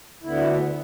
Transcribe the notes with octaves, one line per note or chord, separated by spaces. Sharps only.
D2 D3 B3 E4